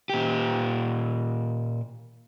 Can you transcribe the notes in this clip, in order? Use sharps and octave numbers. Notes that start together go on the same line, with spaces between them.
A#2 G4